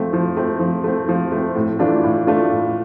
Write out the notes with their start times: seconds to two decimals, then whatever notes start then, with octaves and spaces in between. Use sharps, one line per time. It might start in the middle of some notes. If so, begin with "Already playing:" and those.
Already playing: F3 A3 C4
0.13 F3
0.37 A3 C4
0.60 F3
0.84 A3 C4
1.08 F3
1.31 A3
1.37 C4
1.55 A2
1.79 E3 A3 D4 F4
2.04 A2
2.27 E3 A3 D4 F4
2.51 A2